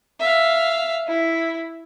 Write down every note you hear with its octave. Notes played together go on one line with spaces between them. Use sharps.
E5 F5
E4